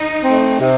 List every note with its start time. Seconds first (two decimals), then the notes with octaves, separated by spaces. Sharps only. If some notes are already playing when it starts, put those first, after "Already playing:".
Already playing: D#4
0.23 A3 C4
0.60 C3